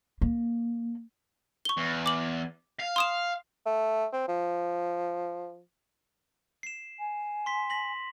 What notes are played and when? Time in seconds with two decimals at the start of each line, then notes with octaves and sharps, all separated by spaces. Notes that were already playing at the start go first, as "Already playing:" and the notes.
0.22 A#3
1.65 C#6 G7
1.77 E2
2.06 D6 F#7
2.80 F5
2.96 C6 D#6 E7
3.66 A3
4.13 C4
4.28 F3
6.63 C7 E7
6.99 G#5
7.46 C6 B6
7.70 A#6 B6 F#7